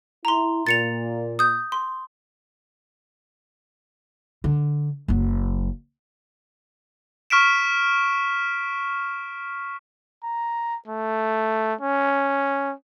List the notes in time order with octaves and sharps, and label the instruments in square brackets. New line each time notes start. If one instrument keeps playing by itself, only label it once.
[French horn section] E4 [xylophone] A#5 C6
[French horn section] A#2 [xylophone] A6 C#7 F7
[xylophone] D#6 G6
C6
[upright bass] D3
F#1 F#3
[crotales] C#6 F6 B6 D7 E7
[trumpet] A#5
A3
C#4